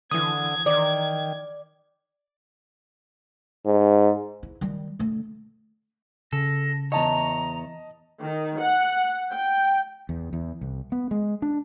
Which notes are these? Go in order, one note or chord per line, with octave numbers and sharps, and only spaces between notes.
D3 E3 D#6 G#6
D#3 D5
G#2
E4
D#3 G3
D3 A3
C#3 A4 A#6
E2 C#5 D#5 A5 A#5
D#3
F#5
G5
E2
E2
C2
B3
G#3
D4